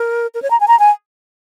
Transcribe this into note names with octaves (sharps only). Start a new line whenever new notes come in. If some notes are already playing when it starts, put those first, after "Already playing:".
Already playing: A#4
A#4
C#5
A#5
G#5
A#5
G#5